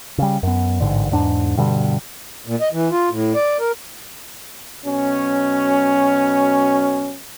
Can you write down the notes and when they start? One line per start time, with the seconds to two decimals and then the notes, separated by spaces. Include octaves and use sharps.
0.18 C#3 G3
0.43 F#2 B3
0.80 A1 G#2 D3
1.11 E2 G#2 D4
1.57 G2 B2 D3 G3
2.47 A#2
2.61 D#5
2.72 E3
2.90 F4
3.10 A2
3.35 D5
3.60 A#4
4.85 B2 F#3 C#4